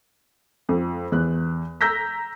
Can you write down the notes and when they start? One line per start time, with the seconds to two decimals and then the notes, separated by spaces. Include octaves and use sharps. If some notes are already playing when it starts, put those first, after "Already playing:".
0.69 F2
1.12 E2 F#6
1.81 A#5 E6 G6 A#6 B6